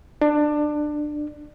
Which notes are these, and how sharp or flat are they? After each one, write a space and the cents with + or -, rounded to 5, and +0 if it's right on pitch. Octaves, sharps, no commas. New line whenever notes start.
D4 +20